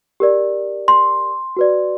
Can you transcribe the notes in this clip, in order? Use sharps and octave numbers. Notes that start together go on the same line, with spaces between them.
G4 A#4 D5
C6
F#4 B4 D5